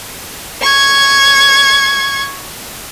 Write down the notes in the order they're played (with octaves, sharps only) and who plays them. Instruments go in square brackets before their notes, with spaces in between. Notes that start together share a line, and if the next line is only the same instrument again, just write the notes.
[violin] C#6 G#6